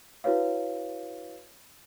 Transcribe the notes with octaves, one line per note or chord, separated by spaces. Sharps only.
E4 F#4 B4 C#5 F5